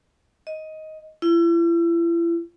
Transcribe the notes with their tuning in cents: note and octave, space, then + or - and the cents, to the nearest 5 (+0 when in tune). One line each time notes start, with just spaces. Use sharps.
D#5 +10
E4 +40